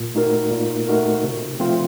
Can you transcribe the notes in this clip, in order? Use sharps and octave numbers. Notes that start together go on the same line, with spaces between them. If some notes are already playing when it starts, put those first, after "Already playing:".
Already playing: A#2
A3 D#4 F#4 A#4
A#2
A3 D#4 F#4 A#4
C3
F3 A3 C4 F4